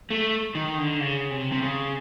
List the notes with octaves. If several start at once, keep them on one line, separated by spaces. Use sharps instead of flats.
A3
D#3
D3
C#3
C3
C3
C#3